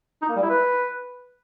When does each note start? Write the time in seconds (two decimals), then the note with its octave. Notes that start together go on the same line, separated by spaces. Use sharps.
0.22 D#4
0.29 A#3
0.36 G3
0.43 E4
0.50 B4